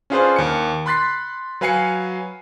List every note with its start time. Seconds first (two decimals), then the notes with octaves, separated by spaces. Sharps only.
0.10 C#4 D4 F4 G#4 B4 C5
0.36 D#2 C#7
0.86 B5 C6 F#6 A6 B6 C7
1.61 F#3 B4 F5 G#5 C7 C#7